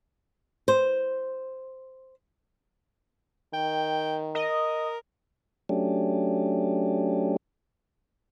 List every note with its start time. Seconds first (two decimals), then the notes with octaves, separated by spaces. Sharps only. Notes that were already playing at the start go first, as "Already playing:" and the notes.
0.68 C5
3.53 D#3 G5
4.35 A#4 D#5
5.69 F#3 A3 C#4 D4 G4